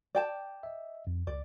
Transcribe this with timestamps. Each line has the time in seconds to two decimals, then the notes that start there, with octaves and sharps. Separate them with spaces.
0.15 D5 G5 A5
0.63 D#5 E5
1.07 F2
1.27 C#2 D5